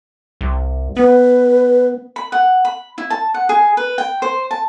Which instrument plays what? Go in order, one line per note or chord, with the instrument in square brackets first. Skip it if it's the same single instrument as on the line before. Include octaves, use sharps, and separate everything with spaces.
[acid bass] C2
[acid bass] B3 [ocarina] B4
[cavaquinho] B5
F#5
B5
E4
A5
F#5
G#4
B4
G5
C5
A5